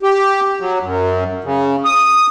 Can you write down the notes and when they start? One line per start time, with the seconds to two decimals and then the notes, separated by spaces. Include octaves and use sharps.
0.03 G4
0.60 F#3
0.82 F#2
1.44 C#3
1.85 D#6